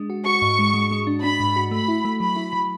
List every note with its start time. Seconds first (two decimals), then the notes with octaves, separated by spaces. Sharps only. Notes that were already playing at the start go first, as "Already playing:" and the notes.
Already playing: G#3 D4
0.10 F#4
0.26 F#4 C#6
0.42 G#2
0.59 G#3
0.74 G#3
0.91 G#3
1.07 D4
1.23 D4 B5
1.40 G#2
1.56 F#4
1.71 A3 B5
1.88 E4
2.05 A3
2.20 F#3 B5
2.36 E4
2.53 F#3